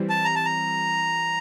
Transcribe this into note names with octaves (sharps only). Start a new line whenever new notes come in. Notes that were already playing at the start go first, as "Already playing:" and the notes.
Already playing: E3 G3 C4
A5
A#5
A5
A#5